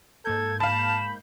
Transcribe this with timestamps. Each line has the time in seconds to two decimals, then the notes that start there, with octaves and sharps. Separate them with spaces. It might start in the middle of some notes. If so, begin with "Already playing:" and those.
0.25 G#2 A#3 A4 G6 G#6
0.60 F5 A5 B5 E7